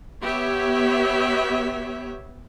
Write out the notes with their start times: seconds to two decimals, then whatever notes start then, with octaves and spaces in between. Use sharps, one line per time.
0.22 B3 G4 C#5 E5